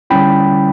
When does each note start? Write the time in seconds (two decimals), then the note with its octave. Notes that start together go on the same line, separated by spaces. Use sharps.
0.10 D3 G3 C#4 E4 G5 B5